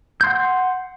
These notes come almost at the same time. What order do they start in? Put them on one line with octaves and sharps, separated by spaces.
G6 C6 F#5